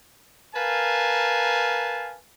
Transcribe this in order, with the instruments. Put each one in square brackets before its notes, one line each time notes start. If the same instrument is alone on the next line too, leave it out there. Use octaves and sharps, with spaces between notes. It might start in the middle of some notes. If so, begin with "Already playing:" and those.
[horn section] A#4 B4 F5 G#5 A5